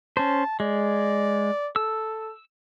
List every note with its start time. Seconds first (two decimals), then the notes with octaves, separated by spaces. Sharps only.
0.17 C#4 C5 A5
0.60 G#3 D5
1.76 A4 E6